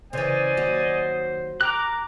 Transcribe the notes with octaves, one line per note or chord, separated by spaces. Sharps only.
C#3 E3 C5 D5 D#5 G#5
D#2 F#3 F#4
G4 A#4 A#5 D6 F#6